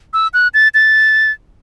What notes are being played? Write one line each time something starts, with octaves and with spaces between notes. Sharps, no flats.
E6
F#6
A6
A6